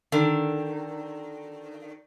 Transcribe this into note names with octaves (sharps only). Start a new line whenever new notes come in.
D3 D#3